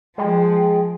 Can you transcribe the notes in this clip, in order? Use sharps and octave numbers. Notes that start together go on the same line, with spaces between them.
F3 G#3 G5